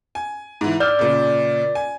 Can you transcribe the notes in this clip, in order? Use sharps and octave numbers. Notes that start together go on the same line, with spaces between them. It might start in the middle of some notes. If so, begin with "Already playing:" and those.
G#5
G#2 E3
D5 E6 F6 G6
A#2 C#3
G#5